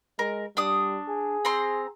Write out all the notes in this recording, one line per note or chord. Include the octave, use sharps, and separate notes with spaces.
G#3 A#4
G3 D4 D#6
G#4
C4 A#5 C6